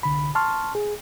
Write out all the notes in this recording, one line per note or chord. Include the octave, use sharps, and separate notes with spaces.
C2 D3 B5
A5 C6 C#6 F6
G#4